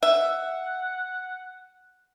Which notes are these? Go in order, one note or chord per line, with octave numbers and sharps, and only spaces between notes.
E5 F#5